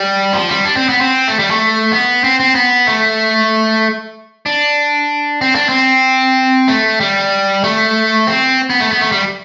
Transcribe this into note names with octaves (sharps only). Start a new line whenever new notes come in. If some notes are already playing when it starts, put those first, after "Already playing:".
Already playing: G3
F3
G3
D4
C4
B3
C4
A3
G3
A3
B3
C4
C4
B3
A3
D4
C4
D4
C4
A3
G3
A3
C4
B3
A3
B3
A3
G3